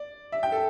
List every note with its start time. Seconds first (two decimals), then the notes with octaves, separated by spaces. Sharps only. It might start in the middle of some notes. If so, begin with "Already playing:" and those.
Already playing: D5
0.32 E5
0.43 G5
0.52 A4